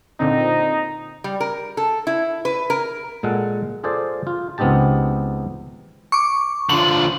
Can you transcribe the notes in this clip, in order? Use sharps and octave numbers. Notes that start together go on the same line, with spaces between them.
A#2 D3 C4 D#4
G3
A#4
A4
E4
B4
A#4
A#2 G#3 A4 F#5
F4 G#4 A4 C5 D5
F4
C#2 B3 C4 D#4 G4 A5
C#6 D6
D3 F3 F#7